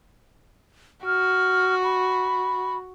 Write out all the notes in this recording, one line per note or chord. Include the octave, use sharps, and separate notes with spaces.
F#4 F6
B5